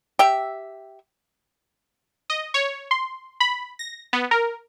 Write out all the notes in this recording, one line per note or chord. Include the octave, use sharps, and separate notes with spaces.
G4 E5
D#5
C#5
C6
B5
A#6
B3
A#4